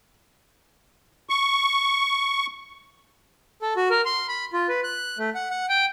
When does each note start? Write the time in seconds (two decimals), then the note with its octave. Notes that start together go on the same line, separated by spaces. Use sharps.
1.29 C#6
3.62 A4
3.76 F#4
3.90 A#4
4.05 C6
4.28 B5
4.53 F4
4.68 B4
4.84 F#6
5.18 A3
5.35 F#5
5.50 F#5
5.69 G5